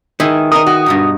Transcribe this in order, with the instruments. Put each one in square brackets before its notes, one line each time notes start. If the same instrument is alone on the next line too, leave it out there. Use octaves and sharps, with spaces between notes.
[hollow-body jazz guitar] D#3 [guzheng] E4 G#4 B4
[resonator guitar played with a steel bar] D#4 A#4 [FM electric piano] D#6
[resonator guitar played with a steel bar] F#4
[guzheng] G2 B2 D#4